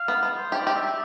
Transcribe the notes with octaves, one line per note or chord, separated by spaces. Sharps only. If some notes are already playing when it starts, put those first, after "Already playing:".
Already playing: F5
B3
B3
C5
G4
D5
G4
E5